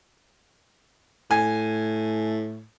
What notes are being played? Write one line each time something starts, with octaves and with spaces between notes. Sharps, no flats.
A2 G#5